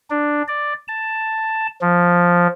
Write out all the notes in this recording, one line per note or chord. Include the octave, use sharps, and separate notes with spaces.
D4
D5
A5
F3